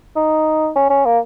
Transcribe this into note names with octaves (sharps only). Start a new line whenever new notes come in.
D#4
C#4
C#4
A#3